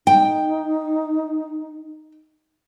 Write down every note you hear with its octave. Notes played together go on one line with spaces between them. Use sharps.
D#4 G5